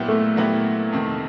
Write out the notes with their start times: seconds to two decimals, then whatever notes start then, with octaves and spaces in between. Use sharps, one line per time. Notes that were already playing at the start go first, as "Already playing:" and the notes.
Already playing: A#2 F#3 B3 E4 G4
0.08 A3
0.36 A#2 F#3 B3 E4 G4
0.92 F2 C3 D#3